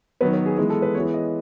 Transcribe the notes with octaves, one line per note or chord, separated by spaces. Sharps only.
D#3 F#3 B3 B4
B4
G#4
E3 G#3 B3 G#4
A4
B4
E3 G#3 B3 C#5
D#5